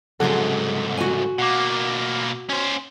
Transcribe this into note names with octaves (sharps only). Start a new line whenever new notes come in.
C2 G#2 C#3 F#3 G#4 A4 C5 F#5
F#4 G#5
B2 A#3 F#5 D6
C#4 C5